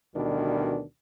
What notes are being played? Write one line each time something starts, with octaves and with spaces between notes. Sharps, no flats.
D2 B2 D#3 E3 G3 D4